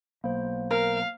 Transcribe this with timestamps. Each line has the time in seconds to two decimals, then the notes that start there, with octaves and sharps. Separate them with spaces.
0.24 B1 A#3 C5
0.71 A#4 F5